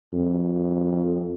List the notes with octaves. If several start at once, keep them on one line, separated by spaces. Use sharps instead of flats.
F2